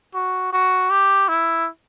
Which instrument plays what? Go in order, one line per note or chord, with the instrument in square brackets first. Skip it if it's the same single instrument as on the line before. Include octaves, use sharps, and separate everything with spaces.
[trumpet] F#4
F#4
G4
E4